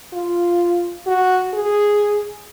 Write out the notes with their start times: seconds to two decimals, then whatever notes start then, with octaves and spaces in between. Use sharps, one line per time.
0.13 F4
1.07 F#4
1.53 G#4